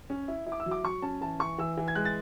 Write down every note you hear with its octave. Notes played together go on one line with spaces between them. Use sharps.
C#4
E4
E4
D6
E6
F#3
D6
F#3 C#6
C#4 A5
E3 A5
E3 C#6
E3 E6
E3
G#6
G#3 F#6
A6